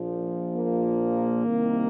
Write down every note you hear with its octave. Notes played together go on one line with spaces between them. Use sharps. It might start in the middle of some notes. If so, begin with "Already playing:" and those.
Already playing: A#1 A#2 F3
A#3
C2 C3 D#3